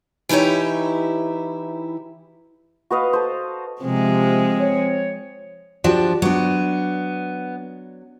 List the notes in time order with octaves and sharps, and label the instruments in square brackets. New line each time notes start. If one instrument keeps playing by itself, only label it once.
[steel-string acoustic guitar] E3 D#4 E4 G4 C#5
[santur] F#4 B4 D#5 F5
A4 C5
[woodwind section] C3 [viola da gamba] F3 G#3 [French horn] C4
[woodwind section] C#5
[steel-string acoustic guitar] F3 D4 [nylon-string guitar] F#4 G4
[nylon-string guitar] F#3 D4 [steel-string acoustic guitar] B3